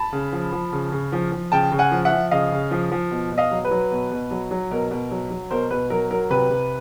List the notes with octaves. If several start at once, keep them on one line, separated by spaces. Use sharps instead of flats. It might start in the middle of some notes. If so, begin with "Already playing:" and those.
Already playing: A5 B5
C#3
F3
F3
C#3
C#3
F3
F3
C#3 G5 A5
C#3
F#5 G#5
F3
E5 F#5
F3
C#3 D#5 F5
C#3
F3
F3
B2
B2
D#5 F5
F#3
B4
F#3
B2
B2
F#3
F#3
B2 A#4
B2
F#3
F#3
B2 A#4 C5
B2 B4
F#3 A#4
F#3 A#4
C3 B4
C3